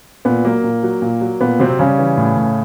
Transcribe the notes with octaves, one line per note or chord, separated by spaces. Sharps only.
A#2 B3
F#3 A#3
A#2
F#3
A#2
F#3
A#2 B3
C3 F#3 C4
C#3 G3 C#4
E3
A2
A2